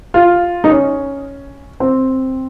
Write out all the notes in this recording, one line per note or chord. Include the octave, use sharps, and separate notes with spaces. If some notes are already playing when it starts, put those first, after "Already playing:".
F4
D#4
C#4
C4